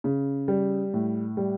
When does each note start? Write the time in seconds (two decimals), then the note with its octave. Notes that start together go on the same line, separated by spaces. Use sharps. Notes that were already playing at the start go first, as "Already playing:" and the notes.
0.04 C#3
0.48 G3
0.94 A2
1.37 G3